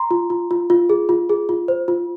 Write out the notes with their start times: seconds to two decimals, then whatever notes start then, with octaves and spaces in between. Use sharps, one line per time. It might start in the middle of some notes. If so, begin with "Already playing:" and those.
Already playing: A#5 C6
0.11 F4
0.30 F4
0.51 F4
0.70 F4
0.89 G#4
1.09 F4
1.29 G#4
1.49 F4
1.68 C5
1.88 F4